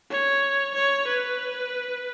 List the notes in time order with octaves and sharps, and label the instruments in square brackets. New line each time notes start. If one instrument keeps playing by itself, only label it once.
[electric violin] C#5
C#5
B4